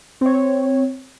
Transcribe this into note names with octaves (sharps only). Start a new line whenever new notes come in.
C4 C#5